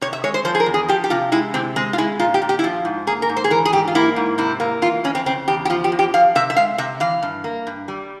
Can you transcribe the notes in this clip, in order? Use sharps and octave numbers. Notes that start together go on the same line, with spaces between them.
C3 C#5
E5
G#3 C#5
C5
F3 C5
G#4
A#4
E2
G#4
F3 G4
G4
C3 F4
G#3 E4
C3 C4
G#3 C4
F4
G#3 E4
A#2 F4
G4
A#2
G4
E4
F3 F4
G#2
A#3 G#4
A#4
G#2
C5
G#4
E3 A#4
G#4
G#2 G4
F4
A#3 E4
G#2
C3 E4
A#3
E3 F4
F2 C#4
C4
C#3 C4
E2 G4
G4
F3 F4
G4
E2
G4
F3 F5
C3 E5
E5
G#3 F5
C3 E5
E3 F5
G2
A#3
G2
G3